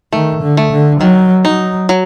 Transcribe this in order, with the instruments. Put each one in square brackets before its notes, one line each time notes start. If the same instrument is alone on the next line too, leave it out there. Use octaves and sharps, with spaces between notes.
[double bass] D#3 [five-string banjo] A3
[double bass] D3
[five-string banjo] A3
[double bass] D3
[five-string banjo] D#3 [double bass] F#3
[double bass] F#3 [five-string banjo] D#4
[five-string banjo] F#3